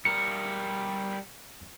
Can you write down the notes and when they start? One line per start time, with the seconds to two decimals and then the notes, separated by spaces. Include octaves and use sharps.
0.05 G3 A#4 C#7